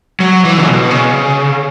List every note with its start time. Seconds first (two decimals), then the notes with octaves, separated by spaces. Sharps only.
0.20 F#3
0.45 E3
0.57 C#3
0.68 B2
0.91 C#3